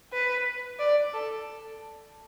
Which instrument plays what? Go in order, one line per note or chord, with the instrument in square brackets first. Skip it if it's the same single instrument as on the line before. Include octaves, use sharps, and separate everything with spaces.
[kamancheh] B4
D5
A4